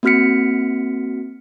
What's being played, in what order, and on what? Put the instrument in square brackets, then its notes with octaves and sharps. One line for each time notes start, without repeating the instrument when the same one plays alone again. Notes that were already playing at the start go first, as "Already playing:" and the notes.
[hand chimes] A#3 C4 F#4 F6 B6 C#7